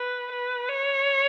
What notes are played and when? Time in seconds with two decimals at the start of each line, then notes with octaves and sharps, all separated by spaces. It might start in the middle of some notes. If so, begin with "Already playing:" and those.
Already playing: B4
0.32 B4
0.68 C#5